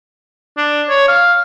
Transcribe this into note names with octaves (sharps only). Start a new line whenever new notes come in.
D4
C#5
F5